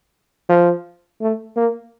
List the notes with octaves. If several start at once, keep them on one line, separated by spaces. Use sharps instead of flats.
F3
A3
A#3